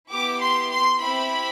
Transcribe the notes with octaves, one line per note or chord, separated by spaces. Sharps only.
B3 E4 G4 D6
C6
C6
C4 E4 G4 B5